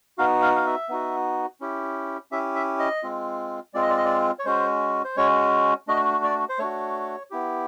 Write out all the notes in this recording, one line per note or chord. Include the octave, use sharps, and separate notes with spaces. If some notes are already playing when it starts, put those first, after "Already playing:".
B3 D#4 F#4 F5
F5
F5
E5
B3 D#4 F#4
C#4 E4 G4
C#4 E4 G4 E5
E5
D#5
G#3 C4 F4
G#3 C4 F4 D5
D#5
D5
D#5
D5
C#5
G#3 C#4 F#4 C5
C5
G#3 C#4 F#4 C#5
A3 D4 F#4 D#5
D5
C5
A3 D4 F#4 C#5
B3 E4 G4